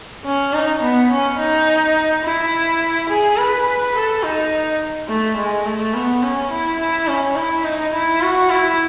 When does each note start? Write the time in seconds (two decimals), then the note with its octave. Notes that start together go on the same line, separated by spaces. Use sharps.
0.25 C#4
0.53 D#4
0.82 B3
1.11 C#4
1.39 D#4
2.24 E4
3.09 G#4
3.37 B4
3.95 A4
4.23 D#4
5.08 A3
5.37 G#3
5.65 A3
5.94 B3
6.22 C#4
6.51 E4
6.79 E4
7.07 C#4
7.36 E4
7.64 D#4
7.93 E4
8.22 F#4
8.50 E4